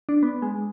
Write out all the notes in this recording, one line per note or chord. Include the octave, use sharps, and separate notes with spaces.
D4
B3
G#3